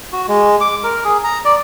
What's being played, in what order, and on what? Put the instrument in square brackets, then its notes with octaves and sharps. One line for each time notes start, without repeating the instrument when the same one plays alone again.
[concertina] F#4
G#3
D6
A#4
G#4
A#5
D5